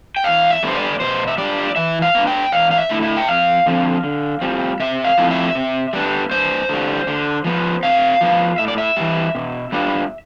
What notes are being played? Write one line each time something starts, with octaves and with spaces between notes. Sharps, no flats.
G5
E2 F5
E5
D3 G3 B3 C5
D5
B2 C5
E5
G3 D4 F4 D5
E3 E5
F5
B3 D4
G5
E2 F5
F5
E5
D3 A3 E4
E5
G5
F2 F5
D3 F3 C4 F4
D3
G3 C4 F4
C3 E5
F5
F3 A3 C4 E4
E5
C3
G3 B3 D4
G2 C5
D3 G3
D3
F3 B3
C3 F5
F3 B3 F4
A2 E5
D5
E5
E3 G3
B2
G3 B3 D4 F4